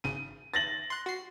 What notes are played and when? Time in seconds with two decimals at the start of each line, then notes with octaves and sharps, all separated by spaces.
0.04 G#1 C#3 D#7
0.54 A6 A#6 F#7
0.90 C6 F#6
1.06 F#4 C7